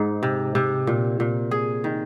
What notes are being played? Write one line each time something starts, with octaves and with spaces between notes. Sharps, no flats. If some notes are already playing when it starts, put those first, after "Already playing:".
Already playing: G#2 D#4
C3
C3
A#2
A#2
G#4
D#3